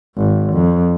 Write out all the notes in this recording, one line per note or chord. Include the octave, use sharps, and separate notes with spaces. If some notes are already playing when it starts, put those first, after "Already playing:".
G#1
F2